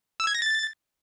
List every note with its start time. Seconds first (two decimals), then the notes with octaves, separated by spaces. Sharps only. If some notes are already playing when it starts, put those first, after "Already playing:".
0.20 E6
0.27 G#6
0.35 A#6
0.42 A6